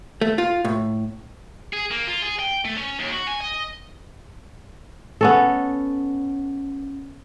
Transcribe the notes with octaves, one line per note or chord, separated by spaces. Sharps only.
A3
F4
A2
G#4
A#3
F4
G#4
G5
A3
C#4
D#2
F#4
G#5
D#5
B3 C#4 A4